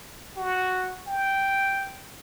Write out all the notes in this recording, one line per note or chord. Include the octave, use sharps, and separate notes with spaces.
F#4
G5